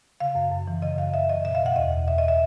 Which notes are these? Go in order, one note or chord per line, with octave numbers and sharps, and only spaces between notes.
C#3 F5
F#2
F#2
E3
C#3 D#5
F#2 F5
F#2 E5
E3 D#5
B2 E5
F5
B2
F#5
E2 D#5
E2
B2 E5
B2 D#5
E5